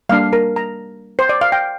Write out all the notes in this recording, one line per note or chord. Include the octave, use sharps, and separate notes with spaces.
G3 A#3 D4 F5
A#4
A#5
C5
D5
F5
G5